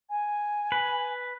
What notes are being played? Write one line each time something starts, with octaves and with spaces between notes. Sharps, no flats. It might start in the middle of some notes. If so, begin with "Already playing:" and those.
G#5
B4